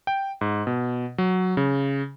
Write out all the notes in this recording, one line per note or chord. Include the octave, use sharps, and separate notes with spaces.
G5
G#2
B2
F#3
C#3